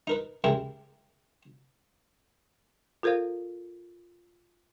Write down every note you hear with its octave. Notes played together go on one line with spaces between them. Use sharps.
D#4 A#4 B4
C#3 G#3 E4 G4 A#4
F4 A4 A#4 C5 F5